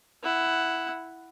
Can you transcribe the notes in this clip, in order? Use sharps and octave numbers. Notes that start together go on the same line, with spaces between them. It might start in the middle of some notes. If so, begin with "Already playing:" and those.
E4 F#5